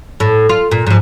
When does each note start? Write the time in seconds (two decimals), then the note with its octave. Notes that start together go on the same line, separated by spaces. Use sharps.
0.20 A2
0.49 F4
0.71 A#2
0.87 G#2 F3